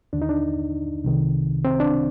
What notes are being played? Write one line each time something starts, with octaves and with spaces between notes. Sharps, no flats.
D#2 D3 D4
D#4
D4
C2 C3 D#3
C4
D4